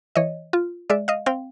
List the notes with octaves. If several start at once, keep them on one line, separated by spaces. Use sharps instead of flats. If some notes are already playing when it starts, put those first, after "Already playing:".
E3 C#5 D#5
F4
G#3 D5 E5
D#5 F5
C4 F5 G5